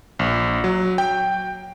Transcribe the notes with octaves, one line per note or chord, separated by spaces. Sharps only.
A#1
F#3
G5